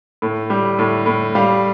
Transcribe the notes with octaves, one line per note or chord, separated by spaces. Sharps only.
A2
G3
A2
A2
G3 F5